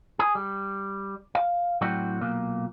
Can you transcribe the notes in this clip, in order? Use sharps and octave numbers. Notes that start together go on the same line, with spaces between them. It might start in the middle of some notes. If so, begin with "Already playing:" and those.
G#4
G3
F5
A2 F#3 C4 F#4 D5 G5
B1 A#2 A#3